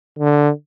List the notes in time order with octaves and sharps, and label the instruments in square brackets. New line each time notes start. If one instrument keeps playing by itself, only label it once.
[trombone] D3